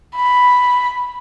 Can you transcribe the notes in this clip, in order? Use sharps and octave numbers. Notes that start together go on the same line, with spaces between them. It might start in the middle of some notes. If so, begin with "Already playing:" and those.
B5